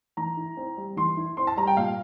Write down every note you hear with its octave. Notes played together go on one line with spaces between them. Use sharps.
E3 A#5
E4
C4
G3
E3 C6
E4
C4 C6
A5
G3 A#5
G5
A#2 F5